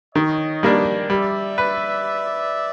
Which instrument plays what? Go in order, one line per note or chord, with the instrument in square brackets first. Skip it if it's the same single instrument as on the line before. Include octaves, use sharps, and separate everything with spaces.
[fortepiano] D#3 [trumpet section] C#5 D#5
[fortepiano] G3 A#3 D4
[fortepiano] G3 [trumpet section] D5 E5
[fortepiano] B4